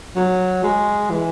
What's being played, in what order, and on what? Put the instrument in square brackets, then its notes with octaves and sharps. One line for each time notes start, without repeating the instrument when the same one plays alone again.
[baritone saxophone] F#3
G#3
E3